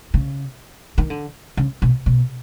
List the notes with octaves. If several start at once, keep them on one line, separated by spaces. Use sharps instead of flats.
C#3
D#3
D3
C#3
B2
B2